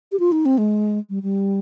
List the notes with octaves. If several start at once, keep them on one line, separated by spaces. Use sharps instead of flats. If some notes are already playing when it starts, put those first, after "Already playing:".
G4
F4
D#4
C4
G#3
G3
G3